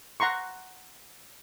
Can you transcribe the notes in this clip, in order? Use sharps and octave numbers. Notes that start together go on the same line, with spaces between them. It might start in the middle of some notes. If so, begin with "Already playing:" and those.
F#5 A#5 C6 C#6